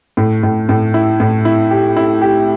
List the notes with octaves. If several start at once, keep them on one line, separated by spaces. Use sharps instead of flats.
A2
A2
A2
E4
A2
E4
G4
E4
G4